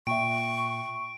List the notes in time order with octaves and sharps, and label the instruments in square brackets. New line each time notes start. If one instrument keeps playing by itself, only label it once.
[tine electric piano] A#2 [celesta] E5 G5 [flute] C#6 [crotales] D7